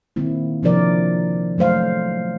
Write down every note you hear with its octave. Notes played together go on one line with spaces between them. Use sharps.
D#3 A#3 C4 E4
C3 F3 D4 E4 A#4 D5
F#3 A3 C5 F5